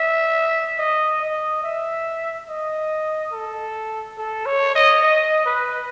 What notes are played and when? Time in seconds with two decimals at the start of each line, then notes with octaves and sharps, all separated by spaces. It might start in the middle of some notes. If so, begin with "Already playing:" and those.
Already playing: E5
0.78 D#5
1.21 D#5
1.63 E5
2.49 D#5
3.32 A4
4.18 A4
4.46 C#5
4.75 D#5
5.03 D#5
5.45 B4